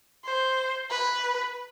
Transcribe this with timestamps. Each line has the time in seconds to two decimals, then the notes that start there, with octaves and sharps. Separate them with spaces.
0.25 C5
0.91 B4